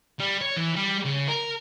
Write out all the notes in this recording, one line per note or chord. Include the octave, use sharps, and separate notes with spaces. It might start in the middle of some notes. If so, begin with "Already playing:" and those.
G3
C#5
E3
G3
C#3
A#4